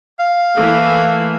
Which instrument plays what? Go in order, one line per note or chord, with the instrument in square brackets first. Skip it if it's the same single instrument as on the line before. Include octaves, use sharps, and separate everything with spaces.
[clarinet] F5
[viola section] E3 A3 A#3